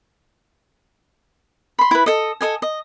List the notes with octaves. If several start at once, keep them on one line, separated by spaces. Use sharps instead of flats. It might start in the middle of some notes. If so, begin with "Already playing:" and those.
B5 C6
E4 B4
A4 D#5
A4 D#5 G#5
D#5